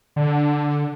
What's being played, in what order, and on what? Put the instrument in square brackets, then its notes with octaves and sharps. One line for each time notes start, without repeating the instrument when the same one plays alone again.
[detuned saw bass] D3